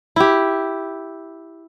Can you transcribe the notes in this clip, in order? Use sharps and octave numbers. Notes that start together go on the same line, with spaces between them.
E4 G4